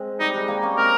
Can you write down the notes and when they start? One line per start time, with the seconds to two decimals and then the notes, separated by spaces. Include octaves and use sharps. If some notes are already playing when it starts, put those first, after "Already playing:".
Already playing: G#3 C4
0.20 G3 D#4
0.34 G#3
0.48 G3 A#3
0.63 A#3 C#4
0.77 C4 D#4 A#4